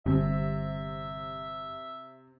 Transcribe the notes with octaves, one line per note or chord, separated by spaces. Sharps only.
G1 C3 E5